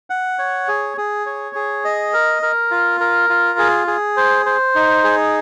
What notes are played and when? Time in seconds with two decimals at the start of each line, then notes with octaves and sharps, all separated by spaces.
0.10 F#5
0.39 C#5
0.68 G#4
0.97 G#4
1.26 C#5
1.55 G#4
1.84 D#5
2.13 A#4
2.42 A#4
2.71 F4
3.00 A#4
3.30 F4
3.59 G#4
3.87 G#4
4.17 C5
4.46 C5
4.75 D#4
5.04 G#4